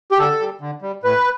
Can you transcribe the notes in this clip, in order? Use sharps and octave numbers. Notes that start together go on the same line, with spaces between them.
G4
D3 A4
G3
D3
G3
A2 B4